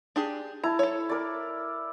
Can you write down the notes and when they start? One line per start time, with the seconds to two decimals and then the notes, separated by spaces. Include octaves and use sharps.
0.16 D4 G4 G#4
0.64 E4 A5 A#5
0.79 A4 C#5
1.09 A#4 D5